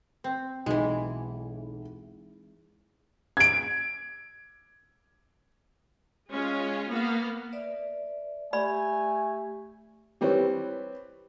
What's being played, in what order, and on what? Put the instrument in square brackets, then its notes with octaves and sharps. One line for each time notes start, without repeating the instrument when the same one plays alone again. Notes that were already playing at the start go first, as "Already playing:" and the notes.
[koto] C4
[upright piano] B1 [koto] E3 G#3
[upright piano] G#6 D7
[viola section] G#3 C#4 F4
A#3 B3 F5
[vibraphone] B4 D5 E5
[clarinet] A3 [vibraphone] G4 [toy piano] D5 B5 [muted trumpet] G#5
[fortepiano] E3 G3 C4 [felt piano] G4 B4 C#5